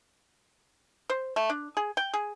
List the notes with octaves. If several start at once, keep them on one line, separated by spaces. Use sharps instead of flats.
C5
A3
D4
G#4
G5
G#4